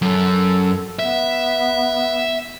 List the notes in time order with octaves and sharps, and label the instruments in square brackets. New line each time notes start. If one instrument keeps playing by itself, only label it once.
[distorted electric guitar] F#2 [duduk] A4
[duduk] B3 [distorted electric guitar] E5